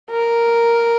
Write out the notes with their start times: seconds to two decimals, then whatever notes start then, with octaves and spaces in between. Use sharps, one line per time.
0.11 A#4